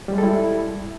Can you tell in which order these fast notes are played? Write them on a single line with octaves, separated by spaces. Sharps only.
G3 G#3 A4 E4